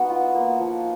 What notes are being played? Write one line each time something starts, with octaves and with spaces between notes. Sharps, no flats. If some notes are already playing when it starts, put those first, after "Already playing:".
Already playing: B3 D#4 F#4
F4
A#3
F3